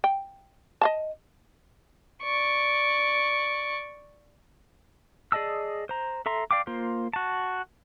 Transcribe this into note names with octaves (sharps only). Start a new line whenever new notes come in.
G5
D#5 F5 A5
D5 C#6
G#4 D5 D#5 A5 E6
C5 A#5
A4 E5 A#5 C6
D5 F5 G5 D6
A#3 F4 C5
F#4 A5